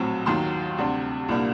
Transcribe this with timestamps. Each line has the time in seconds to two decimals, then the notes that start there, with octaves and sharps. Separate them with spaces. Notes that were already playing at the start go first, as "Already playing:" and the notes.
Already playing: A#1 A2 F#3 C4
0.26 D#2 D#3 F#3 C6
0.78 D2 C3 G3 D4
1.28 C2 A#2 G3 A#3 D4